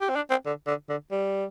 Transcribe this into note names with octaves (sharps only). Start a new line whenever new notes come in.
G4
C4
D4
C4
D3
D3
D3
G3